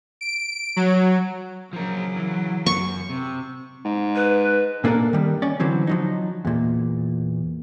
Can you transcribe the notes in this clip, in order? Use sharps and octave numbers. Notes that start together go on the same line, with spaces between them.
D7
F#3
C#3 F3 F#3 A#4
E3
F#2 C#6
C3
G#2
B4
A#2 A#3 D4 D#4 A4 A#4
D#3 G3
C#4 D5
D3 E3 F#3 C4
F3 F#3 D#4
E2 A#2